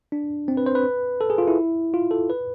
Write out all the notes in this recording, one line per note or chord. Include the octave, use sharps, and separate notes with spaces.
D4
C4
B4
C5
B4
A4
G#4
F4
E4
F4
A4
B4